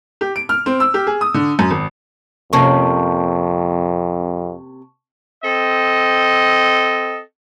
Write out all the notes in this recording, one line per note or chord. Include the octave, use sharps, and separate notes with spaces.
G4
D7
F6
C4
E6
G4
G#4
D#6
D3
F#2
G#1
F2 C3 A#3 C#4 A5 C#6
C4 A4 D#5